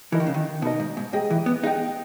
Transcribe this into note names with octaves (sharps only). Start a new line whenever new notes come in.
E3 D#4 A#4 D#5
D#3
C#3
D#3
B2 D#4 A#4 D#5
G#2
G#2
G#2 G#4 D#5 G5
E3
B3
D#4 G#4 D#5 G5